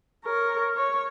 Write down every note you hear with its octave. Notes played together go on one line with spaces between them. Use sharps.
A#4 C#5
C#5